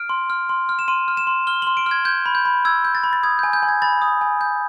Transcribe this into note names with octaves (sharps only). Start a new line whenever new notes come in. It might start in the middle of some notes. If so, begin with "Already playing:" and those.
Already playing: F6 D7
C6
F6
C6
F6
E7
C6 D#7
F6
E7
C6
F6 G7
C6 F#7
D7
F6
G#6
G6 G#6
B5
G6
B5
E6 G#6
G6
A6
B5
A6
D#6 G#6
G#5 G6
G6
G#5
G#6
B5 A6
D#6
G#5
G6